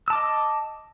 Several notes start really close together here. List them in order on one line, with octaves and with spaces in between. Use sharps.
E6 A5 D6 D#5